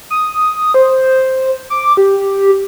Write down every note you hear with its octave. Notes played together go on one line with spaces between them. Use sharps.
D#6
C5
D6
G4